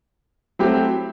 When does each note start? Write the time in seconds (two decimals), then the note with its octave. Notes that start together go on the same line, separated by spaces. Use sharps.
0.59 F#3 A3 C4 E4 G4